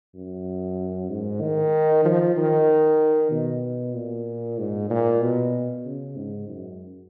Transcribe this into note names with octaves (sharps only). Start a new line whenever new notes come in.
F#2
G#2
D#3
F3
D#3
B2
A#2
G#2
A#2
B2
C#3
G#2
F#2